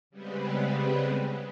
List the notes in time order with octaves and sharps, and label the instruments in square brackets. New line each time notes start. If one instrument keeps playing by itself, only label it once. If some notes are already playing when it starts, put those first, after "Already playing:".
[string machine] C#3 G3 G#3 B3 C4 B4